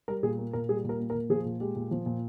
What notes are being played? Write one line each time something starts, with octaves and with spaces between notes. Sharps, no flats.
G3 A#4
A#2 G#4
A#3
A#2 A#4
G3 G#4
A#2 A#4
A#3
A#4
A#2
F3 G#4
A#2
G#3 G4
A#2
F3
A#2